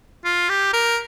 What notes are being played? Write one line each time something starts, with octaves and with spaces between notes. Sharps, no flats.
F4
G4
A#4